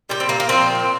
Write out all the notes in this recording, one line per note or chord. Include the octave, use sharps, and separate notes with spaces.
A#2 G3 G4
C4
A#3
A#3
A#2 F3 C4